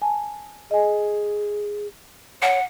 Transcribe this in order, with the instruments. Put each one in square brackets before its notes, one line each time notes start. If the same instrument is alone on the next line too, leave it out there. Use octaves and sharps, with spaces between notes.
[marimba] G#5 A5
[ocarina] G#4 [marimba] D#5 G#5
[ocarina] C#5 [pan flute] F#5